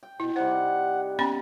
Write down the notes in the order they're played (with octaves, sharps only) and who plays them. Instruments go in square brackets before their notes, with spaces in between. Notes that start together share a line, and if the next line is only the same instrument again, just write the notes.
[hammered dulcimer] G5
[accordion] B2 [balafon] E4
[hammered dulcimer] C3 G3 D#4 [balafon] C5 [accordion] F#5
[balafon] B3 C#4 B5